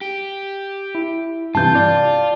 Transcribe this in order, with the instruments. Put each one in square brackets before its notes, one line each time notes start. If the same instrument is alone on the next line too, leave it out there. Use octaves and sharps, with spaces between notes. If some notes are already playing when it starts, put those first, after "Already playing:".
[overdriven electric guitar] G4
[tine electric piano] E4
[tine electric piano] G2 C3 E3 [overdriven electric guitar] F4 [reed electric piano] A5 G6
[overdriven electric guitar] F4 [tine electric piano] D5